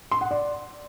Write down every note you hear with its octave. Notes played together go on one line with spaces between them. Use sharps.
C6
F#5
D5